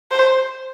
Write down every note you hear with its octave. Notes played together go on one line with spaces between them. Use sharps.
C5